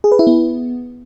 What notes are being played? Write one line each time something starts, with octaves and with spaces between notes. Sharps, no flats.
G#4
B4
E4
B3